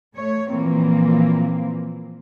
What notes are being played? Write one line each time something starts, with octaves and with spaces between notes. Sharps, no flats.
A3 C#5
A#2 E3 F3 A#3 C4